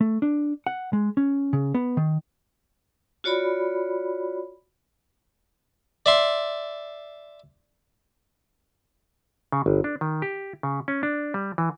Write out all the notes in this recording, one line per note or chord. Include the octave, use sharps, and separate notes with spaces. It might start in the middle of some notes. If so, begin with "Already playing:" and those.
A3
D4
F#5
G#3
C#4
C#3
B3
D#3
F4 F#4 C#5 D5 B5
D5 E5 C6
C#3
G1
D4
D#3
G4
C#3
C#4
D4
G3
E3